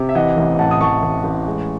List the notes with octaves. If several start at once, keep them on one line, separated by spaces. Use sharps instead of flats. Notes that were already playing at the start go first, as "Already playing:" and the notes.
Already playing: C3
E5
E3 D#5 F#5
A1
A2 F#5 A5
D#6
A1 A5 C#6
A1
A1
G#3